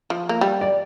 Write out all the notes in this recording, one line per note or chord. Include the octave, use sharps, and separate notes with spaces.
F3
A#3
G3
D5